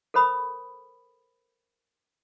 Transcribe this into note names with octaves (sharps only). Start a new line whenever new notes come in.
A4 A#4 C5 B5 D#6